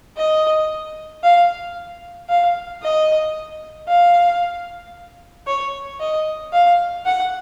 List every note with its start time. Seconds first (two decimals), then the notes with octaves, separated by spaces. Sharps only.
0.17 D#5
1.24 F5
2.29 F5
2.83 D#5
3.88 F5
5.47 C#5
6.00 D#5
6.53 F5
7.05 F#5